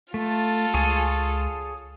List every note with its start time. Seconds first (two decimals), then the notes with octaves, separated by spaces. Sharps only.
0.14 A3 F4 A4
0.74 C#2 G#4 C#5 G#5